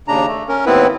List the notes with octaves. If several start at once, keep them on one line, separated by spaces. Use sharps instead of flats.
D#2 C#3 D4 A#5
A3
C#4 A#4
D#2 A2 B3 C4 E4 B4